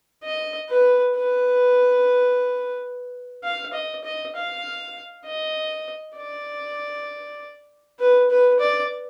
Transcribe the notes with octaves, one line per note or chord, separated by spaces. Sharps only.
D#5
B4
B4
F5
D#5
D#5
F5
D#5
D5
B4
B4
D5